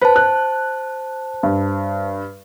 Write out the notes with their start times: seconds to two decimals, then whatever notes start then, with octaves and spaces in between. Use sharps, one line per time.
0.01 B4 C5 A5
0.16 F#6
1.43 G2